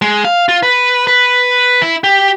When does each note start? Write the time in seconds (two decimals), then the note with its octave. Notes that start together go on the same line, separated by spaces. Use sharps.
0.02 G#3
0.25 F5
0.49 F4
0.63 B4
1.07 B4
1.82 E4
2.04 G4